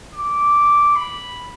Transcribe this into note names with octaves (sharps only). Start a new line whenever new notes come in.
D6
B5